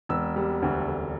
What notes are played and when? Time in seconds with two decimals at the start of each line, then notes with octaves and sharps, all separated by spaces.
0.09 E1 E6
0.36 G3
0.62 D2
0.87 D3